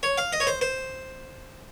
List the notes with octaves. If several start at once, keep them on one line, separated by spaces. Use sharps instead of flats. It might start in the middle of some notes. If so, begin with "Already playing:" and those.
C#5
F5
D#5
C#5
C5
C5